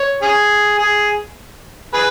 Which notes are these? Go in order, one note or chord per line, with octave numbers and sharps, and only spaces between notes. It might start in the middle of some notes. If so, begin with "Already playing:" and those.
Already playing: C#5
C#4 G#4
G#4
G#4 B4